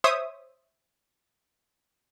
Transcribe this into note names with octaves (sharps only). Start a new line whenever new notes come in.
C5 C#5 E5 D#6